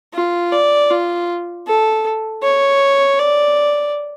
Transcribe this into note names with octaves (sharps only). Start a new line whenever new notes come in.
F4
D5
F4
A4
C#5
D5